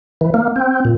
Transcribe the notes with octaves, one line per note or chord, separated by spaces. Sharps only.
E3
A#3
C4
A#2